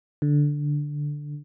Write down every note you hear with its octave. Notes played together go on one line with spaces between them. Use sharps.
D3